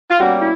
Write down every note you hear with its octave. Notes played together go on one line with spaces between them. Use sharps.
F4
B2 G3 A#3 C#4 F#4
E4